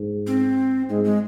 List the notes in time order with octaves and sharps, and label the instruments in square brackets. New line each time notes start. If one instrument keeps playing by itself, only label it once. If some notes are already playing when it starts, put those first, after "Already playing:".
Already playing: [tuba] G#2
[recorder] C4
[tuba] G#2 [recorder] G#3
[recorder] G#3